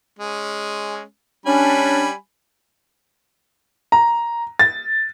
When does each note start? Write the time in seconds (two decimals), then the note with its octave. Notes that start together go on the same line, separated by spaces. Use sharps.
0.19 G#3 C#4
1.46 G3 C#4 D4 G#5 B5
3.92 A#5
4.59 A6